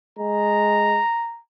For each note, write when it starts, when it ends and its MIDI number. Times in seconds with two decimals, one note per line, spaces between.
0.19 0.99 56
0.19 1.40 82